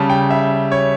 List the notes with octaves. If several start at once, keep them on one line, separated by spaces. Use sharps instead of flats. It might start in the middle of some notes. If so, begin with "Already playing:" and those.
Already playing: C#3 G3 A5
G5
E5
C#5